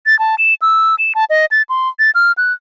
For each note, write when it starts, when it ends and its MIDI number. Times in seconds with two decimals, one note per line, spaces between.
0.06 0.18 93
0.19 0.35 81
0.38 0.54 100
0.62 0.95 88
0.99 1.13 100
1.15 1.25 81
1.30 1.46 75
1.51 1.62 93
1.69 1.89 84
1.99 2.11 93
2.15 2.32 89
2.38 2.53 90